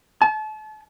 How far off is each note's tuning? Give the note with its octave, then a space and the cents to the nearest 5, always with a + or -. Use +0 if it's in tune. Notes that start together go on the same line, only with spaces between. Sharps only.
A5 -35